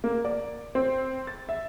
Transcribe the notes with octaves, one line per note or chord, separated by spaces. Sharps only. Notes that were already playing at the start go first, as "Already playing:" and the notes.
A#3
D5
C4
A6
E5